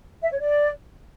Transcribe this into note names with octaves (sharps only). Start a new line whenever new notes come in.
E5
C#5
D5